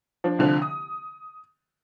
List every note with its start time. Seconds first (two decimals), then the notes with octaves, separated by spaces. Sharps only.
0.24 F3 D4
0.39 C2 D3 F3
0.62 D#6